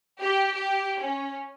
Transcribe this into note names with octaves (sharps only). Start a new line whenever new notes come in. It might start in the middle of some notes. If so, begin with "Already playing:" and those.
G4
G4
C#4